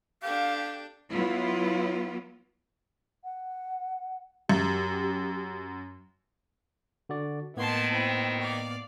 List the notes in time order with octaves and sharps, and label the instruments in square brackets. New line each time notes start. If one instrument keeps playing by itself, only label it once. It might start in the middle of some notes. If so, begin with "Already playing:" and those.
[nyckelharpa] D4 A4 [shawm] G4 [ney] F5
[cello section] F#3 B3 E4 F4
[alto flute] F#5
[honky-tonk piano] F#2 [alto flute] G4
[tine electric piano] D3 F#4 D5
[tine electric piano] A2 A#3 B3 [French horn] D#3 [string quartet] A5 C6 G#6
[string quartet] C4 E4 F#4
D5 F5